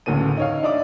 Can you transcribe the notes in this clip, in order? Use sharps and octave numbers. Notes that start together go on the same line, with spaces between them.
A1 D2 C#3 A#3 D#7
D#4 C#5 F5
D4 D#4 D5 E5 D6